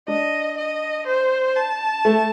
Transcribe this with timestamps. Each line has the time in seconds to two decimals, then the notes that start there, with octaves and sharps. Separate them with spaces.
0.08 D4 D#5
0.57 D#5
1.06 C5
1.56 A5
2.05 A3